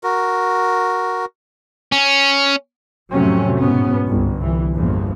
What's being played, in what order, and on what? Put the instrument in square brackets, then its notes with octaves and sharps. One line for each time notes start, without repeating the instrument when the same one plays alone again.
[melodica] F#4 A#4
[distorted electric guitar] C#4
[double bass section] F2 A2 C3 F#3 A3 C#4
G#2 B2 B3 C#4
G1 C2
C2 E3
G1 E2 A#2 F3